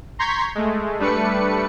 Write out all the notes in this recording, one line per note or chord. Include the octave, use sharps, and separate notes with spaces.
A#5 C6 C#6 G6 G#6 B6
G#3 A3
G3 A3 D4 B4 C#7